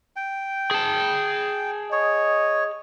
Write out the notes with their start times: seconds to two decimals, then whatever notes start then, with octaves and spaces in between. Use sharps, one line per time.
0.16 G5
0.71 G#4 A5
1.92 C#5 D#5